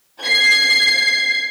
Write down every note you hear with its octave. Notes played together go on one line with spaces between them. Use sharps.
G#6 C7